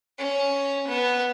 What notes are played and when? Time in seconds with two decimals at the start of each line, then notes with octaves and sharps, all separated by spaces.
0.18 C#4
0.88 B3